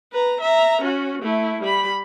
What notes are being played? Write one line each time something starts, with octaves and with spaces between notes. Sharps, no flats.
B4 A#5
E5 A#5
C#4 F#4
A3 E4
G3 B5